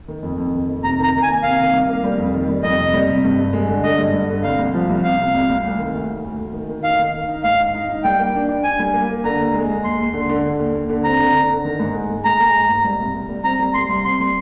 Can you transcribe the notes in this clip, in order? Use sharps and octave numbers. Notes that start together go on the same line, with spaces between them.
D#3
F2
F2
D#3
F2
C3 A#5
D#3 A#5
D#3
G#5
A#3
C3 F5
D#3
C2
A#3
G3
F2
D#3
G3
F2 D#5
C3
G3
C3
G2
G2
G#3
D3
D3 D#5
G2
G2
D3
C2 F5
C2
F3
C2
C3 F5
C3
C2
C2
D2
D#3
D2
D2
D2
D2
D#3
D#3
D#4 F5
D#3
D#3
D#4
G#2 F5
D#4
D#4
D#4
G3 G5
A#3
D4
D4
D4 G#5
G3
A#3
A#3
D3 A#5
D#2
G#3
G#3
D#2 C6
D#2
D3
D3
D3
D#2
D#2
D3
C4 A#5
D3
D3
D3
D#3
G#2
G#3
G#3
G#3 A#5
G#3
G#2
G#2
G3
C2
C2
G3
C4 A#5
G3
G3 C6
C2
C4 C6
G3